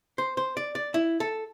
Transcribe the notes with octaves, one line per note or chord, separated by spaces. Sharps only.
C5
C5
D5
D5
E4
A4